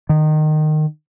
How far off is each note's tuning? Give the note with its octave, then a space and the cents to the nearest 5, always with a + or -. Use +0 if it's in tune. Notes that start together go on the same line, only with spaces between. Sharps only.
D#3 -20